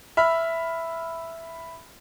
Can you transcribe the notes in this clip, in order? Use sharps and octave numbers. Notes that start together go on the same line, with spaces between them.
E5 B5 F6